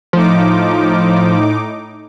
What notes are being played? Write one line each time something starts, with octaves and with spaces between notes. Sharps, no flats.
A2 F3 D#4 D6